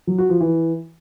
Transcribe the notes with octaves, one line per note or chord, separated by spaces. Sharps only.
F#3
F#4
F3
E3